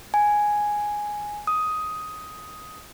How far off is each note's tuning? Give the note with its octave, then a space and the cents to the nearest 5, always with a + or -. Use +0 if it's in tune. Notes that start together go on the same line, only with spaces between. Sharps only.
G#5 +0
D#6 +10